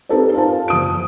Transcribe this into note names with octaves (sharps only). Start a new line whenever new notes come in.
C4 D#4 G4 A4 B4 D5
F4 A#4 C5 A5
F#1 D#6 D7